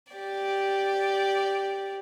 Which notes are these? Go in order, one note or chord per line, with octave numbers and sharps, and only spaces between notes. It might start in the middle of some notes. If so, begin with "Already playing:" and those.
G4 D5